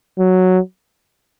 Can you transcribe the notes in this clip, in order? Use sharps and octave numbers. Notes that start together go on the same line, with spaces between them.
F#3